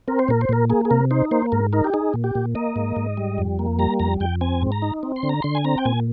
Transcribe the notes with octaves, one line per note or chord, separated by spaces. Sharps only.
C4 A#4
C5
A#2 A#4
C5
A#2 A#4
A#3 G#4
G#4
C3 A#4
D#4 C5
A#3 C5
G#2 A#4
D#4 A#4
G4
D#4 G#4
A#2
G4
A#2
A#3 D#5
G#2
G#2
G3
F2
A#3
G3 A#5
F2 A#5
F2 G5
C4 G#5
G#2
A#5
D#4
C4
C6
D3
A#5
D3 C6
G#5
C4 A#5
G5
A#2 G#5